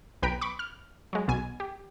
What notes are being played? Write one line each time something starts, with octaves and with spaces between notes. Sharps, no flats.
B1 B4 G5 A#5 B6 D7
B5 C#6 D6
F6
F#3 G#3
B1 B2 G#5
G4